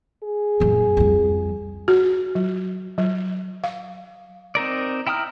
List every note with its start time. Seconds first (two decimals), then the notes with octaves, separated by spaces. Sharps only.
0.23 G#4
0.60 F#2 A#2
0.97 F2 G3
1.88 F#4
2.35 F#3
2.98 F#3
3.64 F5
4.55 C4 D#4 A#4 D5
5.07 E4 G5 A#5 D#6 F6